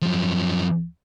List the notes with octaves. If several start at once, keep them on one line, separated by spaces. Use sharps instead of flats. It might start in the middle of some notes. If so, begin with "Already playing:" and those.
F#2 F3